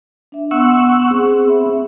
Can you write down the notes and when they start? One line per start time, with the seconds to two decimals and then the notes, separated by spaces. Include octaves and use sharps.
0.32 D4 E5
0.51 B3 F#5 C6 C#6 E6
1.11 C4 G#4
1.48 E5 B5